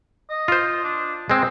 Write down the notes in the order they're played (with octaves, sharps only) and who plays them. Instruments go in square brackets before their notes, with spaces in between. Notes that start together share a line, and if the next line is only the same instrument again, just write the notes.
[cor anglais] D#5
[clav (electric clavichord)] F4 C5
[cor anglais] D4
[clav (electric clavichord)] G#3 C4 [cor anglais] D#5